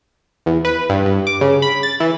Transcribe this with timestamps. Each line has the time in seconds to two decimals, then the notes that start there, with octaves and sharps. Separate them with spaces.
0.46 E2
0.65 B4
0.89 G2
1.05 G2
1.27 D6
1.41 C#3
1.62 B5
1.83 A6
2.00 E3